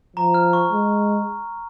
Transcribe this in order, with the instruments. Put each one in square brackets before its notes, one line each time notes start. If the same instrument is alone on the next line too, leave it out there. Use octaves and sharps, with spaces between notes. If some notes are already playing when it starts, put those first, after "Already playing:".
[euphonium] F3 [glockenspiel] A#5
[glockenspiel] F6
C#6
[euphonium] G#3